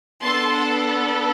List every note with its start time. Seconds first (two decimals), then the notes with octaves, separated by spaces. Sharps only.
0.23 B3 D4 A4 A5 C6
0.54 F#5 A5